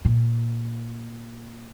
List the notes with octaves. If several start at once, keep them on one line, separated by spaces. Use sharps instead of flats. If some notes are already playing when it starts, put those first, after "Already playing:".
A#2